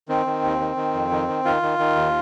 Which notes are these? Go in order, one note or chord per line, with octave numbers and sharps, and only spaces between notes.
D#3 C4
D#3
D#2
D#3
D#3
F2
D#3
D#3
D#3 F4
D#3
D#3
D#2